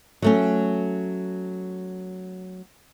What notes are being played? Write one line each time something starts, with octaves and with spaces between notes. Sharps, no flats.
F#3 A3 C#4